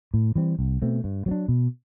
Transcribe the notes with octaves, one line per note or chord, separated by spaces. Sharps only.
A2
E3 G3 C4
C2
B2 A3 C4
G2
F#3 B3
D4
B2